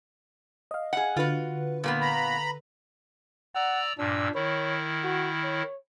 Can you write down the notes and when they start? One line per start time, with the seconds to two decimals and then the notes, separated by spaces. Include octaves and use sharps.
0.71 D#5 F5
0.93 G#4 F#5
1.17 D3 F4 F#4 B4
1.84 A#2 A#3 B3
2.01 A#5 B5
3.55 D5 F#5 A#5 E6
3.98 G2 A#2 D4 E6
4.35 D#3 E4 C#5
5.04 F#4
5.43 C#5